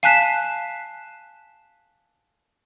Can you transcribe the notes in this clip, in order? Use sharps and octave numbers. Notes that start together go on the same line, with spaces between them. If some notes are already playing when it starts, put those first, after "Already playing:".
F5 G#5 A5 F#6 B6 E7